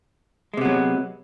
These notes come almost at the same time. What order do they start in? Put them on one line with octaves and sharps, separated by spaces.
G#3 C3 B3 F#3